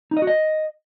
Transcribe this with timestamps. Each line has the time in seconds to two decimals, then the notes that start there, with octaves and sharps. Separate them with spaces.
0.11 D#4
0.17 D#5
0.22 F#4
0.27 D#5